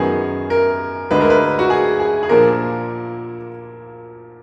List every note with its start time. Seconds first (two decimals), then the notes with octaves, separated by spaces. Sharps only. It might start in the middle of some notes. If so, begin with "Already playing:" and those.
Already playing: F#2 D#3 F#3 B3 G#4
0.50 A#4
1.11 D2 D3 G#3 D4 B4
1.21 A#4
1.30 B4
1.59 F#4
1.70 G#4
2.00 G#4
2.23 G#4
2.29 A#2 F3 A#3 D4 A#4